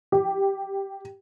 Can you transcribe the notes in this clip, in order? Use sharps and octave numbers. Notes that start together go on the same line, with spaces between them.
G4